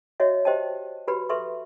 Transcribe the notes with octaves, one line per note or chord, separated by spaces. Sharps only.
F#4 C#5 D#5 E5
G4 C5 D#5 G5 A5
F#4 G4 B4 B5
A4 B4 E5 C6 C#6